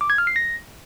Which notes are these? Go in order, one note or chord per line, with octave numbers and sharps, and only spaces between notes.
D6
G#6
F6
C7
A#6